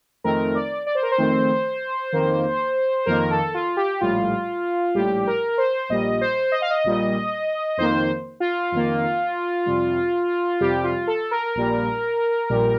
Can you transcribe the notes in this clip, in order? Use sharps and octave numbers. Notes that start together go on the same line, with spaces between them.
F2 D#3 A3 C4 A#4
D5
D5
C5
A#4
C5
F2 D#3 A3 C4
F2 D#3 A#3
F2 D#3 A#3 A#4
A4
F4
G4
A#1 A2 G3 F4
A#1 A2 G3 G4
A#4
C5
A#1 A#2 G3 D#5
C5
D#5
F5
D#5
A#1 A#2 G3
F2 D#3 A#3 C5
F4
F2 D#3 A#3
F2 C3 G3
F2 C3 G3 G4
F4
A4
A#4
A#1 A#2 G3
A#1 A#2 G3